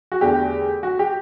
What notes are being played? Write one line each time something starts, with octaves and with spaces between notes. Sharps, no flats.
F#4
E2 D3 A3 G4
F#4
G4